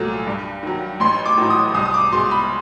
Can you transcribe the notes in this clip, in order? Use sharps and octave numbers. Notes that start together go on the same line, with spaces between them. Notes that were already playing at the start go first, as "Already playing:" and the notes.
Already playing: C2 A#2 F#3 A3
G2
D#3 F#3
A1 C6
D6
A2 F#3
D#6
C2 D#6
D#6
D6
B2 G#3 C6
B5